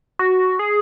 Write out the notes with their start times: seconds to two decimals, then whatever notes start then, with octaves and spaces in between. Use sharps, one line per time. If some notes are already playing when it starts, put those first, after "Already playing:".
0.19 F#4
0.59 G#4